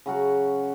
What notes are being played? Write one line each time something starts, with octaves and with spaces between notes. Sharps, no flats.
C#3 F#3 C#4 F#4